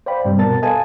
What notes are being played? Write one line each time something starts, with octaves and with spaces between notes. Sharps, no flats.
C5 D5 F5 G5 B5
G2 C3 G3
B2 B3 A#4 A5 A6
A4 B4 D#5 F5 G#5 A5